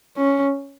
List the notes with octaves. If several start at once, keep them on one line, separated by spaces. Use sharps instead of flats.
C#4